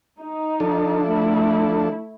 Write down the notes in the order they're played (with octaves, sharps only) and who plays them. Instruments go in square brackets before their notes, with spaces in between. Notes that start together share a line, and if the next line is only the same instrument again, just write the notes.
[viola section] D#4
[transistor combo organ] F3 D4 A4
[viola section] A3 E4